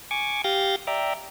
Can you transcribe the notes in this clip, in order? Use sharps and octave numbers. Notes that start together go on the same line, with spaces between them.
G#5 C#6 D6
G4 F5 G6 A6 A#6
D5 E5 G5 A#5